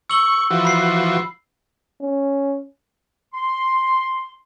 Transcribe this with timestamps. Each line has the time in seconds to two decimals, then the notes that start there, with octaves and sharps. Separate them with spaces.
0.10 C#6 E6 F#7 G7
0.50 E3 F3 F#4
0.65 B5 C7
2.01 C#4
3.34 C6